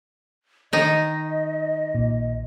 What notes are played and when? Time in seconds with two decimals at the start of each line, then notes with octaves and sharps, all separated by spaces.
0.73 D#3 D#4 D#5
1.95 A#1 A#2